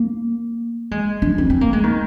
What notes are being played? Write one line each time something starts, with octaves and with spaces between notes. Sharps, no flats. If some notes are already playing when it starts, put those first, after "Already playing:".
Already playing: A#3
G#3
D4
C4
C4
A#3
G#3
D#3